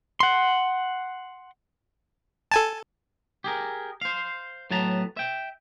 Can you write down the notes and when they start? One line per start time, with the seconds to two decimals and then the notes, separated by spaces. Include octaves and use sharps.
0.20 F#5 C6
2.51 A4 G#5 A5
3.44 G4 G#4 A#4
4.01 C5 F5
4.71 A2 F#3 B3 A5 A#5
5.17 E5 G5